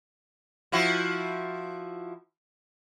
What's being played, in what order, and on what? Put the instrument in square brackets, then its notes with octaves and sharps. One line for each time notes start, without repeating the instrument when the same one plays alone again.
[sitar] F3 E4 F#4